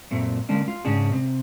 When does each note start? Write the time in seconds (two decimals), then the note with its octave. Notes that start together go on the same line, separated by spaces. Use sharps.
0.11 F#2 A#2 A3 C4
0.49 D3 G#3 A#3 C#4 D4
0.68 F4
0.85 G#2 C#3 C#4 D4 G#4
1.12 C3